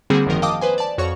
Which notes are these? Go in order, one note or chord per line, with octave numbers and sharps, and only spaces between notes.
D3 G3 A#3 C4 F#4 G#4
G#1 F#2 D#3 F3 A#4 D#5
D#5 F5 G5 A5 D6 D#6
B4 C5 G#5
D5 A5
F2 F#4 C#5 C#6